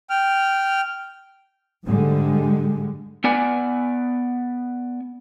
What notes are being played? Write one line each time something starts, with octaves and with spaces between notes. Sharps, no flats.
G5 F6
G#2 D3 G3 G#3
B3 D5 G#5